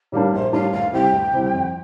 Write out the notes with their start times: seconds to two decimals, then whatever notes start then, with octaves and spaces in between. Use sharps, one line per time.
0.12 A2 G3 A#3 D4 D5
0.32 A#1 C5
0.53 A2 G3 A#3 D4 F5
0.72 D2 F5
0.93 C3 G3 C4 E4 G5
1.12 D2
1.33 C3 G3 C4 E4
1.53 F2